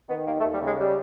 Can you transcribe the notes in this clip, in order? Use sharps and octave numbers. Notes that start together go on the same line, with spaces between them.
D#3 B3
D#2 A#3
A3
D#2
G3
C#3 G#3
G3